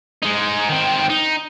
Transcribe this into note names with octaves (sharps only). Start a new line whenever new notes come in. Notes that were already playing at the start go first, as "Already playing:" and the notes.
G#3 D#4
D#3 C4
D#4